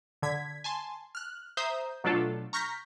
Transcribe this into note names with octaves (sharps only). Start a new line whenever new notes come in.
D3 G#6 B6
G#5 A5 C6
F6 F#6
C5 E5 A#5 D#6 G6
B2 F#3 A3 D4 F4 A4
A#5 C#6 F6 G6 A#6 B6